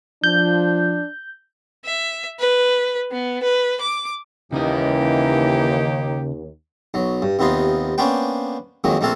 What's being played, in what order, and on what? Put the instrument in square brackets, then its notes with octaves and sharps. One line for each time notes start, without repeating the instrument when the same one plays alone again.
[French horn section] F3 [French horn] D4 [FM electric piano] G6
[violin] E5
B4
B3
B4
D6
[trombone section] D#2 [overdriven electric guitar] C#3 D#5 [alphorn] E3 [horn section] A#3 D#4 G4
[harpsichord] B1 F#3
G2
D#2 C3 B3 D#4 F4 C6
A#3 B3 C#4 D4 C5 G5
F2 D#3 F#3 G#3 A#3
A#1 A3 A#3 C4 A4 F5